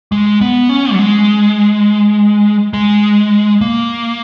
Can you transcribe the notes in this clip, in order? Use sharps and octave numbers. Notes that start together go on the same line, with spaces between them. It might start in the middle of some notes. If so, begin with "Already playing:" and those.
G#3
B3
C#4
F#3
G#3
G#3
A#3